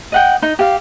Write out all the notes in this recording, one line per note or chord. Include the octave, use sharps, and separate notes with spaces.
D#5 F#5 G5
D#4
G4 F5